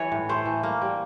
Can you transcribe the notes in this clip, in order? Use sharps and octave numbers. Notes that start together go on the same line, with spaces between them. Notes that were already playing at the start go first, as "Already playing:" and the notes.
Already playing: E3 B4 C#5
A2
A3 C5
E3
A#3
G3